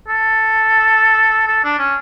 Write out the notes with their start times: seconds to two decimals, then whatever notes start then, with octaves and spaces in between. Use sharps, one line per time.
0.08 A4
1.48 A4
1.64 D4
1.79 C#4